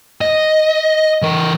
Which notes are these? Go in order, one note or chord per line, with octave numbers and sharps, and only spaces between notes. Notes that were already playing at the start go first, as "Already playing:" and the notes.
D#5
E3 A#4